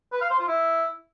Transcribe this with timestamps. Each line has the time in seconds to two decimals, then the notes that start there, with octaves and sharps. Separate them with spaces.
0.12 B4
0.21 F5
0.30 C5
0.39 F4
0.48 E4